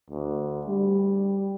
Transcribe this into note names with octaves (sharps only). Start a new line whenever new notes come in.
D2
G3